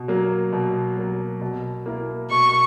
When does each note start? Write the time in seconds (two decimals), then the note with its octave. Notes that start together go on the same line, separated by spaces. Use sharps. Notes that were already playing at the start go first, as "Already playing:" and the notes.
Already playing: B2
0.08 F#3 A#3
0.52 B2
0.97 F#3 A#3
1.41 B2
1.86 A#3 E4 A#4
2.30 B2 C#6